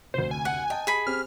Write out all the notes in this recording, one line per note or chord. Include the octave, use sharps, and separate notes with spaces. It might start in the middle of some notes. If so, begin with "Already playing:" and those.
F1 D2 C5
G#5
F#5
D#5 G5 A5
G#4 B5
C4 G4 F6